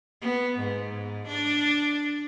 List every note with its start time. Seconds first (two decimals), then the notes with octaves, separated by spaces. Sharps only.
0.21 B3
0.59 G#2
1.27 D4